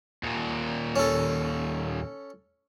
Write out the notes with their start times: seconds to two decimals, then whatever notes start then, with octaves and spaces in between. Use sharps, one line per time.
0.23 D#2 A#2
0.96 C#4 A4